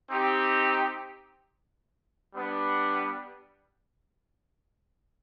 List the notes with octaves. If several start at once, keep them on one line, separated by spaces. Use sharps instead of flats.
C4 D#4 G4
G3 B3 D4